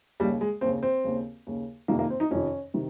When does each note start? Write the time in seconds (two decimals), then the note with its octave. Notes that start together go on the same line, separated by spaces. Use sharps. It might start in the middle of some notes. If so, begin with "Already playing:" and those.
0.20 D#2 C#3 G3
0.41 G#3
0.61 D#2 C#3 C4
0.83 C4
1.04 D#2 C#3
1.47 D#2 C#3
1.88 F2 C3 D#3 A#3
1.99 A#3
2.10 C4
2.20 D#4
2.31 F2 C3 D#3 C#4
2.74 C3 D#3